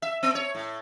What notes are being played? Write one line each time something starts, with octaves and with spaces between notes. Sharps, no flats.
E5
B3
C#5
A2